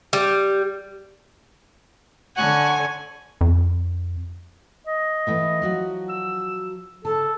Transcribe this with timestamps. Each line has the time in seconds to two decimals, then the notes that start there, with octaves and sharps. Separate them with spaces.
0.13 G3
2.37 D3 C#5 F#5 G#5
3.41 F2
4.87 D#5
5.27 E3 A3 B3
5.62 F3 F#3 F#4
6.09 E6
7.05 C#3 A4 A5